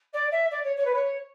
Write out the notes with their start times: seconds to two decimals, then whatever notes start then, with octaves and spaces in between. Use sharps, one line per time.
0.13 D5
0.31 E5
0.50 D5
0.63 C#5
0.76 C#5
0.85 B4
0.94 C#5